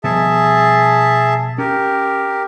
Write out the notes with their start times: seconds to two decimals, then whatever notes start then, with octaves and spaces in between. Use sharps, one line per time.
0.04 B2 F3 G3 G#4 E5 A5
1.58 C#4 G4 A#4